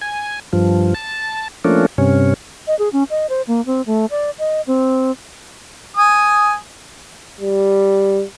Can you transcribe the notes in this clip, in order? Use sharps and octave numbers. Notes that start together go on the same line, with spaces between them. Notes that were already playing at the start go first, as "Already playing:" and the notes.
G#5
G2 F3
A5
F3 A3 A#3 C#4 D4
G2 C3 C#4
D#5
G#4
C#4
D#5
C5
A#3
C4
A3
D5
D#5
C4
G#5 D#6
G3